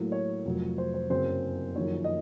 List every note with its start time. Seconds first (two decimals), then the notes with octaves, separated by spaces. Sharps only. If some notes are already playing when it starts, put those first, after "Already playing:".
Already playing: A2 F#3 A#3
0.12 C#5
0.45 F1 F2 C3 F#3
0.78 C5
0.94 C5
1.10 F#1 F#2 C#3 F#3 C4 C5
1.75 F#1 F2 D#3 F#3 C#5
2.04 D#5